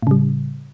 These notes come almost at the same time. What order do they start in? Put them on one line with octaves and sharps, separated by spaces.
A2 C#3 G3